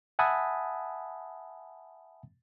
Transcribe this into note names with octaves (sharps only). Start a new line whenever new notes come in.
E5 F#5 G#5 A5 B5 D#6